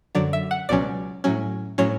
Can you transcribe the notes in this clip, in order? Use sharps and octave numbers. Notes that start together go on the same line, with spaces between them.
F#2 D3 F#3 D5
E5
F#5
C#2 B2 F#3 C#4 D5
A2 F#3 C#4
A2 F#3 C#4 C#5